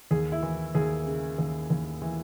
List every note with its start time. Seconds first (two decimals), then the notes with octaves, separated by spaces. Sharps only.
0.11 D#2 G#4
0.32 E4
0.43 E3
0.75 D#2 G#4
1.07 C#3
1.38 D#2
1.70 D#2
2.02 E3